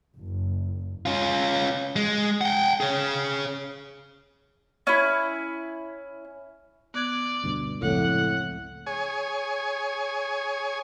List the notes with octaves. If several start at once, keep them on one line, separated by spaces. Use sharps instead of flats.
F#1
C#4 F4
G#3
F#5 G5
G#4 C#5
C#4 E4
B3 D5 F#6 G#6
D2 G2 B2
F#1 C#2 A2 F3 C4 A4 F#5
G#4 C#5 G#5